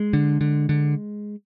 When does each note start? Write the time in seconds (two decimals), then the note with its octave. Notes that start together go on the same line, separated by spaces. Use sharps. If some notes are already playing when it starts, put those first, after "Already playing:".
Already playing: G#3
0.13 D3
0.41 D3
0.69 D3